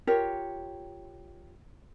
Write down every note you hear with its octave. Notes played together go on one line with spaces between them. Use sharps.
F4 G4 A#4 C#5